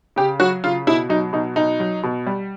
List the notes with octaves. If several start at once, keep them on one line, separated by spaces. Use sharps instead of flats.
C#3 G4
F#3 F#4
C#3 F4
B2 E4
F#3 D#4
B2 D#4
B2 D#4
F#3
B2
G3